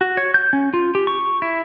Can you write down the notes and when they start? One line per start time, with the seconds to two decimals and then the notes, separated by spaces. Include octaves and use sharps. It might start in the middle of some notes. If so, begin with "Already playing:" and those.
0.01 F#4
0.17 C#5
0.34 G6
0.53 C#4
0.74 F4
0.95 G4
1.07 C#6
1.42 E4